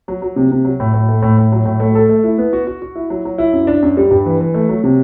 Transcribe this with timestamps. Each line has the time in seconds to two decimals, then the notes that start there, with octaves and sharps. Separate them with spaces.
0.08 F#3
0.22 F#3
0.36 C3
0.51 C3
0.65 F#3
0.80 A2
0.94 A2
1.09 A3
1.22 A2
1.38 A2
1.52 F#3
1.65 A2
1.80 A3
1.95 A4
2.09 A3
2.24 E4
2.38 B3
2.53 F#4
2.67 F#4
2.82 F#4
2.96 E4
3.10 F#3
3.25 F#3
3.38 E4
3.53 F#2
3.67 D4
3.82 F#2
3.97 G3
4.11 G2
4.26 E3
4.40 E3
4.54 A3
4.69 F#3
4.84 C3